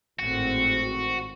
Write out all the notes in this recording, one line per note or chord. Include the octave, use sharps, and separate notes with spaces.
G#1 A2 C4 F#4